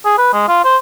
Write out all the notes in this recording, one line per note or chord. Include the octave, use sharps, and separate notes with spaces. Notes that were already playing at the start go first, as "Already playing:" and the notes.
G#4
B4
G#3
F4
C5